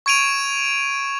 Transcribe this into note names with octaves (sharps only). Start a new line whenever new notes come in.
C#6 G#6 D7 D#7 F7